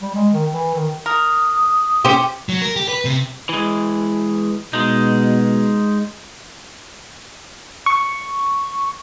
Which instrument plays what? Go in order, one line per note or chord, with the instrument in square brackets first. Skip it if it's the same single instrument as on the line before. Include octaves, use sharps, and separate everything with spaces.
[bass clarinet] G3
G#3
D#3
E3
D#3
[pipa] A#4 [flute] D#6
[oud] C#4 G4 [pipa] C5
[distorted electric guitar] F#3
A#4
G4
B4
C3
[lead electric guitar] E3 G#3
[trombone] B2 [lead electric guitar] G#3 D#4
[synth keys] C#6